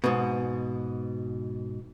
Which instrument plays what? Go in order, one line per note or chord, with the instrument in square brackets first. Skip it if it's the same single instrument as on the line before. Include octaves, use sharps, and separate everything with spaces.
[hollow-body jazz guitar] G#2 B2